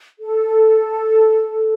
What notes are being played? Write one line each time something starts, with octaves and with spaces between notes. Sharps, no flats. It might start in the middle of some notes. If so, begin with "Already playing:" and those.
A4